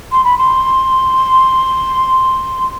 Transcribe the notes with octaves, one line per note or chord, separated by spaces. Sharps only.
C6
B5
C6